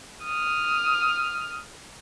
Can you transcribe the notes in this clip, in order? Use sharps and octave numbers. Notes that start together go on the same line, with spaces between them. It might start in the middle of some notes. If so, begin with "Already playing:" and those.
D#6 F6